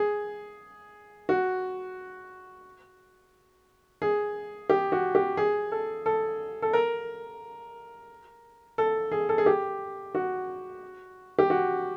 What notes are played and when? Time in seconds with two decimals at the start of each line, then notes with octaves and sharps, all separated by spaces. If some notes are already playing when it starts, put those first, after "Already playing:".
Already playing: G#4
1.29 F#4
4.02 G#4
4.70 G4
4.92 F#4
5.15 G4
5.37 G#4
5.72 A4
6.06 A4
6.62 A4
6.73 A#4
8.78 A4
9.12 G#4
9.29 A4
9.38 G#4
9.46 G4
10.15 F#4
11.39 G4
11.50 F#4